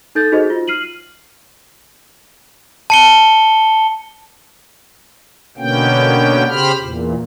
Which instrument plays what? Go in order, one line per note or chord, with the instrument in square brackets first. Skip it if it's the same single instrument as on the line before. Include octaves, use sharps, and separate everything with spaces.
[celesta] D#4 A4 G6 A6
D#4 F#4 G#4 C5 D#5
F4
F6 C7 D#7 F#7
[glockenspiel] A5 C#7 G7
[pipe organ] B2 D3 A#3 B3 C#4 G5
C#3 G4 C5 B5 F6
E2 A#2